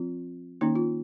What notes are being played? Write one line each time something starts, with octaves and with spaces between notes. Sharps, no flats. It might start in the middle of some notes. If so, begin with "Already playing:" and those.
Already playing: F3 C4 F4
D#3 A#3 C#4 D#4
F4